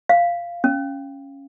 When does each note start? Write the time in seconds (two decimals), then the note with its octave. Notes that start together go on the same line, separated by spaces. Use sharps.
0.09 F5
0.64 C#4